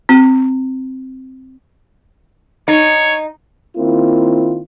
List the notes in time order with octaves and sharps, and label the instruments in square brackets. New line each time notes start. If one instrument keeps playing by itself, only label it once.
[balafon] C4
[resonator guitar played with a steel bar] D#4 [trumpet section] C#5
[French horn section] D#3 A#3 C4 E4 F4